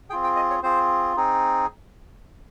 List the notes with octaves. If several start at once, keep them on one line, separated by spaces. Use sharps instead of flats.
C4 F4 G#4 G5
G5
D#5
C#5
C4 F4 G#4 C5
C4 D#4 G#4